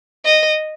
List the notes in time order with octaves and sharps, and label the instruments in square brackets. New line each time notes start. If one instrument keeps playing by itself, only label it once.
[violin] D#5